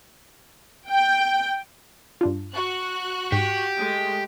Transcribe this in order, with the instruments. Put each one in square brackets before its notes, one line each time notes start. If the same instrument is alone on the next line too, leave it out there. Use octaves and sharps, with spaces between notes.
[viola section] G5
[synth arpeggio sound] G2 D4 F4
[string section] F#4 F#6
[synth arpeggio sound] G#2 [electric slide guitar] G4
[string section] G#3 A3